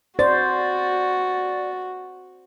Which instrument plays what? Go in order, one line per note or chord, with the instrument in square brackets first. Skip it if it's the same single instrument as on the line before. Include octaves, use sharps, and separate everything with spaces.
[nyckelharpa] F#4 [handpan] C5 [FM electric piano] D5 A6